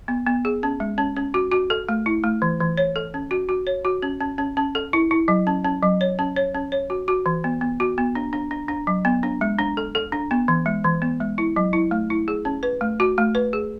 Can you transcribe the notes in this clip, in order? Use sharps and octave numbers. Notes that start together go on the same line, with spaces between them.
B3
B3
G#4
C#4
G#3
C#4
C#4
F#4
F#4
A4
A3
E4
A3
E3
E3
C#5
A4
C#4
F#4
F#4
C#5
F#4
C#4
C#4
C#4
C#4
A4
E4
E4
F#3
C#4
C#4
F#3
C#5
C#4
C#5
C#4
C#5
F#4
F#4
E3
B3
B3
F#4
B3
D4
D4
D4
D4
F#3
B3
D4
G#3
D4
A4
A4
D4
B3
E3
G#3
E3
B3
G#3
E4
F#3
E4
A3
E4
G#4
C#4
B4
A3
F#4
A3
B4
G#4